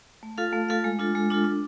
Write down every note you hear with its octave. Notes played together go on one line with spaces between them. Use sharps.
A3
F4 A4 F5
A3
F4 A4 F5
G#3
D4 F4 A4
G#3
D4 F4 A4
D4